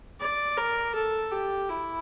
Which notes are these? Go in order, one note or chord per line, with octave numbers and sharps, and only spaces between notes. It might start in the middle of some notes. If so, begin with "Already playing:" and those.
D5
A#4
A4
G4
E4